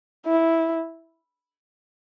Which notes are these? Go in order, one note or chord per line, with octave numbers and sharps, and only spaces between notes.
E4